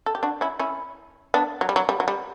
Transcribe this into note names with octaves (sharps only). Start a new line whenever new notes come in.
A4
G4
D4 F#4
C#4 E4
C#4 E4
B3 D4
F#3
G3
F#3
G3
F#3
G3